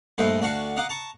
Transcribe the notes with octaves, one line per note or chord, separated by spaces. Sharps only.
A#1 G2 A3 B4 C5 D#5
D2 D4 F#4 F5 C#6
D#5 F5 F#5 A#5 D6
A5 A#5 C#6